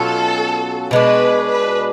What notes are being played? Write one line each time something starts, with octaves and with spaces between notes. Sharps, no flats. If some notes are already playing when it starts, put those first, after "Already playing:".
Already playing: B2 F#3 C#4 F4 A4
B2 G#3 D4 B4
B4